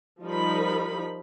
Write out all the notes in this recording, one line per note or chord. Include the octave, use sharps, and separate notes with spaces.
F3 G3 D#4 A#4 B5